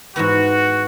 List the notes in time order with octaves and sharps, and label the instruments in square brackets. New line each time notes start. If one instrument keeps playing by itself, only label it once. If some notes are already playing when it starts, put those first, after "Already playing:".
[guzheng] G#2 E3 B3 [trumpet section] F#4